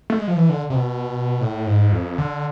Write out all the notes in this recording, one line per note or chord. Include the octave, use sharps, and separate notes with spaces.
A3
G#3
F3
E3
D3
C3
B2
A2
G#2
F2
D3